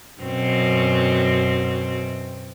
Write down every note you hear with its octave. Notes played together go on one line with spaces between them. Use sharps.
F#2 B2 C4